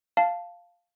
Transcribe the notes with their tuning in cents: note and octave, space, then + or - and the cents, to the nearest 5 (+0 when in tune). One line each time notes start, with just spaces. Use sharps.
F5 +0 A5 +0